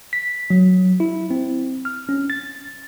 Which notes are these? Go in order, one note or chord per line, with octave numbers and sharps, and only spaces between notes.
B6
F#3
E4
C4
F6
C#4
A6